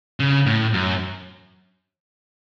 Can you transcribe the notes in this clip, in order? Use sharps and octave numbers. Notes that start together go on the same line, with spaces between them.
C#3
A2
F#2